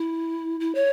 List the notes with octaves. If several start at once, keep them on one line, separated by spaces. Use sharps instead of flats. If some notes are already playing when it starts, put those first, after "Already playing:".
Already playing: E4
E4
C#5